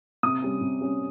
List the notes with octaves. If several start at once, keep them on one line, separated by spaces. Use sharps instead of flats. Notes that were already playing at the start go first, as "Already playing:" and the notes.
C3 D#6
G3 C#4
C3
G3 C#4